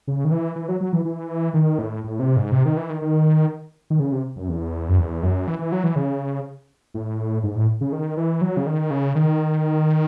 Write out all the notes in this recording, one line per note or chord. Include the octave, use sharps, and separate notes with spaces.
C#3
D#3
E3
E3
F#3
F#3
E3
E3
D#3
A2
A2
C3
G#2
C3
D#3
E3
D#3
D#3
D#3
C#3
C3
F#2
E2
F#2
E2
F#2
E3
E3
F#3
E3
C#3
A2
G#2
A2
C#3
D#3
E3
F#3
C#3
D#3
C#3
D#3